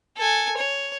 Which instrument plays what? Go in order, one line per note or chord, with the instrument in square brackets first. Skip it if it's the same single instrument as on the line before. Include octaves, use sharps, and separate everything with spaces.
[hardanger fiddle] A4 G#5
C#5